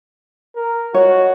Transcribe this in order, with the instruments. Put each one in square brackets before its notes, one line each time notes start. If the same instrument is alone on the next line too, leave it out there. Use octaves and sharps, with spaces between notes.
[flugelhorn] A#4
[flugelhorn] F#4 [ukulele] C#5 D#5